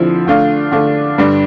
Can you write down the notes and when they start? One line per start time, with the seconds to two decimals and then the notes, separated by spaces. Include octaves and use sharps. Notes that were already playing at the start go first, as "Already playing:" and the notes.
Already playing: D3 F3 C4 E4
0.26 D3 A3 D4 F4
0.72 D3 A3 D4 F4
1.18 G2 D3 G3 D4